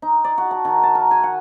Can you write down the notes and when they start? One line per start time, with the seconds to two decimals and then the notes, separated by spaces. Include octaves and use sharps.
0.02 D#4
0.24 D5
0.38 F#4
0.51 A5
0.65 D#3
0.83 A5
0.95 A#4
1.11 G#5
1.23 F#5